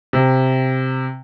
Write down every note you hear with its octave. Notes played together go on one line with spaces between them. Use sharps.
C3